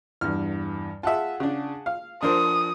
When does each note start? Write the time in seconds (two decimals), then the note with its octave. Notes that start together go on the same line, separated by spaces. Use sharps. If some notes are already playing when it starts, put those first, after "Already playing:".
0.21 E2 G2 F6
1.03 F4 G#4 E5 F#5 A5
1.40 C#3 D4
1.86 F5
2.23 F3 D4 A#4 C5 D#6